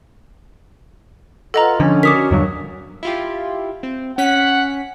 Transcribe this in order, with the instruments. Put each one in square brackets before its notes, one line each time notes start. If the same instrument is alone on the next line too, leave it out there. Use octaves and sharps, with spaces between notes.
[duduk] F4 [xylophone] A4 D#5 A#5 [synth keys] B4 F#5
[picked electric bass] D3 [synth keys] F3 [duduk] C#4
[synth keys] D4 F#4 A#4 [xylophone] D6 D#6 B6
[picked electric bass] E2 G2 D3 [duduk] F#3
[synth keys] E4 F4 G4
C4
[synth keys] C#4 B6 [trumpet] F#5